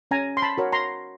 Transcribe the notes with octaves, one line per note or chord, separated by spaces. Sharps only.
C#4 G#5 A#5
C6
A5 B5
F#4 A#4 C#5
A#5 C6